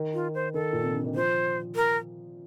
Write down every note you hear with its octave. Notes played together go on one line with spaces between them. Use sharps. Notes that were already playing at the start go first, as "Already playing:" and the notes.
Already playing: D#3
F4
C5
D#3 A4
A#2
C3
D3
D#3
F3 C5
A#4